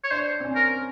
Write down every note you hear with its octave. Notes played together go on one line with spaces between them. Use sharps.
C#5
D4 C5
C4
C#4
A#4